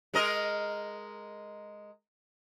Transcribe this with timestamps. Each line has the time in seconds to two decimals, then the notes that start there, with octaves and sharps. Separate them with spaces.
0.14 G#3 A#4 D#5